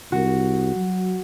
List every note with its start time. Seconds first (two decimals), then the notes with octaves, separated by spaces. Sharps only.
0.12 C2 F#4
0.76 F#3